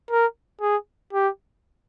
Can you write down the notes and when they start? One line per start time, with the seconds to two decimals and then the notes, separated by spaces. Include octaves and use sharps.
0.11 A#4
0.61 G#4
1.13 G4